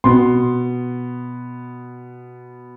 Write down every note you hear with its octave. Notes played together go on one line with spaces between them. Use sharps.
B2 B3 C6